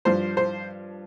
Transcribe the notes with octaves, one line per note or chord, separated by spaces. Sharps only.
G2 F3 C5
C5